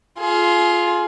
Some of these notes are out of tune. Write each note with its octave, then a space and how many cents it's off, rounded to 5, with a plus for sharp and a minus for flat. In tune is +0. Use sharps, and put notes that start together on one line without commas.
F4 +0 G#4 +35